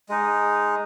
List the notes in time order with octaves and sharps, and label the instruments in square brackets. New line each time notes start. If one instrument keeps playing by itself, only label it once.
[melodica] G#3 D#4